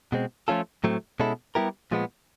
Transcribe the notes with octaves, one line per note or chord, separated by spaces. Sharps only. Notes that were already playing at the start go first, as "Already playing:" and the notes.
B2 G#3 C4
F3 A3 C#4 F4 A4
A2 F#3 A3 C4
B2 G#3 C#4 E4 A4
G3 B3 E4 G4 A#4
A#2 F3 G#3 B3